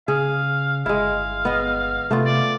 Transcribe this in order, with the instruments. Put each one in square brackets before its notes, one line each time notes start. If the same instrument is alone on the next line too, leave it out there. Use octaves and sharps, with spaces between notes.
[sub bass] C#3 [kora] G#4 [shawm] F5
[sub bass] G1 [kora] G#3 E4 [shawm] F5
[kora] B3 D#5
[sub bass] C3 [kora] A3 B3 F4
[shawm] D5